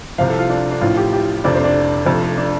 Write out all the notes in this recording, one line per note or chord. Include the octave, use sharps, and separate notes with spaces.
C2 C3 F3 F5
A4
F4
D4
D4
A1 A2 F3 F4
G4
G4
F1 F2 C3 D4
C4
D4
F1 F2 C3 F3
D4